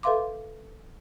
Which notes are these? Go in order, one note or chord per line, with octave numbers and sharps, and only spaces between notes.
A4 B4 E5 F5 C6 D6